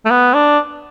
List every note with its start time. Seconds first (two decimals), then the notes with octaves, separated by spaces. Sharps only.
0.06 A3
0.11 B3
0.34 D4